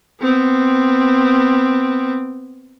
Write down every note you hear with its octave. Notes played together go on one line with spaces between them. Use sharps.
B3 C4